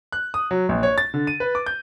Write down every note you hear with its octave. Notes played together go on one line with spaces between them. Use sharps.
F#6
D#6
F#3
A#1
C#5
A6
D3
D#7
B4
D6
G6